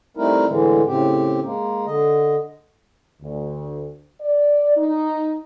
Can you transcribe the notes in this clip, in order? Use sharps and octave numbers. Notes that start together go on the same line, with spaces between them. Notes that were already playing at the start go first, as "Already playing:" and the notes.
G3 A3 C4 D#4 E4 A#4
A2 D3 E3 G#3
A2 C#3 C4 G4
G#3 A#3
D3 D#5
D2
D5
D#4